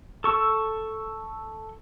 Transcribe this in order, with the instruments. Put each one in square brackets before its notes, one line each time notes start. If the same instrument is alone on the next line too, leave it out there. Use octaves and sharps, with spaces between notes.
[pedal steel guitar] A4 C#6 E6